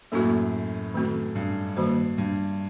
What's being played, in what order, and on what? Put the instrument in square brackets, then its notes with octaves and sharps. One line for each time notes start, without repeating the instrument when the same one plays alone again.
[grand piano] F#2 A2 [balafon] A#3 F#4 A4
[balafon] D#3 A3 C4 F#4 A4
[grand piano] G2
[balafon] D#3 G3 A#3 F#4 C5
[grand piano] G2